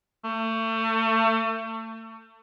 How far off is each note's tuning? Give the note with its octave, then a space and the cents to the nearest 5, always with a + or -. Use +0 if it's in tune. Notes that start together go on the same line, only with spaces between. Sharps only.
A3 +30